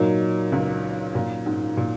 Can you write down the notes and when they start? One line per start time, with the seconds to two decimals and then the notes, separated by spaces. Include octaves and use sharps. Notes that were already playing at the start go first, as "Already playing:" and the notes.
Already playing: A#2 F#3 D#4 A#4
0.52 C#2 C#3
1.15 A#2
1.46 G#2
1.77 A#2